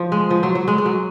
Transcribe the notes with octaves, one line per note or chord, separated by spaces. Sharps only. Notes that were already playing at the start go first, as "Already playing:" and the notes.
Already playing: F3
G#3
F3
F#3
F#3
G#3
G#3
F#3